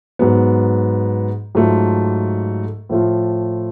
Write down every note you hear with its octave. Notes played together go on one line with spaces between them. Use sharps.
G#2 F#3 B3
G#2 F#3 A3 F4
A2 F3 A3 F4